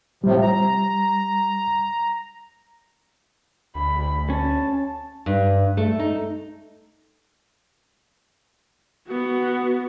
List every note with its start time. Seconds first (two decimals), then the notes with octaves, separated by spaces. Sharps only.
0.24 A2 C3 F3 G3
0.42 A#5
3.75 D2 B5
4.30 C#4 A5
5.26 G2
5.77 A3
5.99 D#4
9.08 B3 F#4